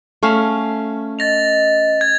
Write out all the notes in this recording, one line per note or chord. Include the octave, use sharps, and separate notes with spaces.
A3 C#4 F5
D#5 A6 A#6 F7
G#6